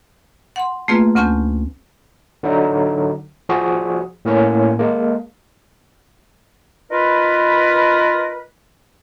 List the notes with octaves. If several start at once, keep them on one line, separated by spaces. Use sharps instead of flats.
F#5 C6
A3 A#3 C4 F4 G#4 B4
D2 C4 C#4 G#5 A5 G6
D3 F#3 D#4
F3 F#4 G#4
A2 A#3 C#4
G#3 A#3
D#4 F4 A#4 B4